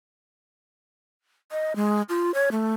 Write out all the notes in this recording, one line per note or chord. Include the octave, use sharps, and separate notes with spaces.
D#5
G#3
F4
C#5
A3